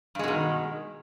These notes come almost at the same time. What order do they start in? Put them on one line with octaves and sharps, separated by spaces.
G2 G#3 B2 D#3